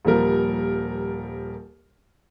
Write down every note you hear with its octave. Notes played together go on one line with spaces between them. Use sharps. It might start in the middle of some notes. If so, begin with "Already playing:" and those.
D#1 F3 G3 A#4